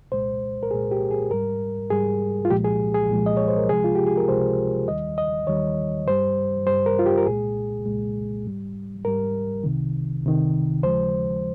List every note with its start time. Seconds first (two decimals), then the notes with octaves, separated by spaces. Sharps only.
0.12 C2 A#2 G#3 C5
0.63 A#4
0.71 C2 A#2 G#3 G#4
0.91 G4
1.11 G#4
1.31 G#2 G3 A#4
1.90 G#2 G3 G#4
2.45 F4
2.50 C2 A#2 F3 G#3 G4
2.64 G#4
2.94 G#4
3.10 C2 A#2 F3 G#3
3.26 D#5
3.37 C#5
3.48 C5
3.58 A#4
3.69 C#2 C3 F3 G#3 G#4
3.84 F4
3.95 G4
4.07 G#4
4.18 A#4
4.28 C#2 C3 F3 G#3 C5
4.88 D#2 D#3 G3 D#5
5.18 D#5
5.47 D#2 D#3 G3 C#5
6.07 G2 G3 C5
6.66 G2 G3 C5
6.86 A#4
6.99 F4
7.06 G4
7.18 A#4
7.26 C2 A#2 G#3 G#4
7.85 C2 A#2 G#3
8.45 G#2 G3
9.05 G#2 G3 A#4
9.64 C2 C3 D#3
10.23 C2 C3 D#3
10.83 D#2 C#3 F3 G#3 C5